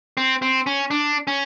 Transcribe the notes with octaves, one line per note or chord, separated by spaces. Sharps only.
C4
C4
C#4
D4
C#4